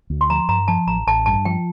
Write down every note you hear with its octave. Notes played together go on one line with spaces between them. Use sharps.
D2
C6
F3 A#5
G2 A#5
F3 A5
A1 A#5
A1 A5
G2 A5
F3 G5